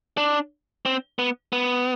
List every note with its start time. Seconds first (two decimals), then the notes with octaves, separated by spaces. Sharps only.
0.18 D4
0.86 C4
1.19 B3
1.53 B3